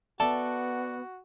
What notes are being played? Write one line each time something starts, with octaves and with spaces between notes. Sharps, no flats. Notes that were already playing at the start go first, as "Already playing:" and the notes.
B3 F#4 A4 D5 E5 A5